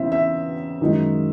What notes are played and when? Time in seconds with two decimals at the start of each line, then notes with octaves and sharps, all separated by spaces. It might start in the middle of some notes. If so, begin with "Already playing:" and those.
Already playing: E2 C#3 E3 C4 D#4 E5
0.12 E5
0.81 F#2 D#3 G#3